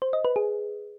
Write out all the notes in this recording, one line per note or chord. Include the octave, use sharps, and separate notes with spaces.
C5
D#5
B4
G#4